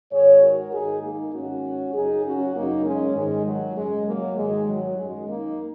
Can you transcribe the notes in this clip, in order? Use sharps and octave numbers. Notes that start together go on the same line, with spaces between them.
G#2 D#3 G#4 C#5
F#4 A#4
G#2 D#3 D#4 G#4
A#3 D#4
G#2 D#3 C#4 F#4
F#2 C#3 D#4 G#4
C#4 F#4
F#2 C#3 A#3 D#4
G#3 C#4
G#2 D#3 G#3
F#3
F#2 C#3 G#3
F#3 A#3
G#2 D#3 G#3
F#3
F#2 D#3 G#3
A#3 D#4